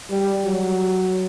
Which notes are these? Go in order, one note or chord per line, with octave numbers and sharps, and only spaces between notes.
G3
F#3